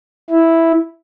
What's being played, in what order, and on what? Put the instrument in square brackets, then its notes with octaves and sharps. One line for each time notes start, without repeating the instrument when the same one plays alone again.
[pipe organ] E4